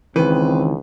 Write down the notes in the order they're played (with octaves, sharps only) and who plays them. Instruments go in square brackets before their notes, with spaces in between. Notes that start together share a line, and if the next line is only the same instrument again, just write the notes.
[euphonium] C#2 [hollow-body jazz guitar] D#3 E3 [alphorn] C4 [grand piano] B4